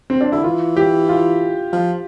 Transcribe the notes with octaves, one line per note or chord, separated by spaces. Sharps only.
C4
D4
D3 E4
E3 F4
G4
F4
F3